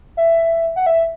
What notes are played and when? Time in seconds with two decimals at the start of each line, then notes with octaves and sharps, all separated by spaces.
0.17 E5
0.76 F#5
0.86 E5